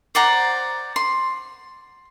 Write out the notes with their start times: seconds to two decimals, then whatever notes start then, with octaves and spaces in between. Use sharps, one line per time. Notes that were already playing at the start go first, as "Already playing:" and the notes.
0.15 C5 D5 F#5 A#5
0.96 C6